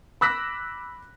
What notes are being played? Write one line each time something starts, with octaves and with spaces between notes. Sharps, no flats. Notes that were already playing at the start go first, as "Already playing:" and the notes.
B5 D6 E6 F#6 A#6 B6